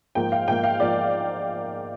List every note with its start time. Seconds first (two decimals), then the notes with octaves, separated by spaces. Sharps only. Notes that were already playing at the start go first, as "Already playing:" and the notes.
0.15 G#2 F3 A#3 G5
0.32 F5
0.47 G#2 F3 A#3 G5
0.64 F5
0.80 G#2 F3 A#3 D5